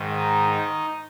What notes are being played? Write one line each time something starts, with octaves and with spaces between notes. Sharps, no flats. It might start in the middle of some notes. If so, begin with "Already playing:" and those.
Already playing: G#2 D#3
D#4
D#4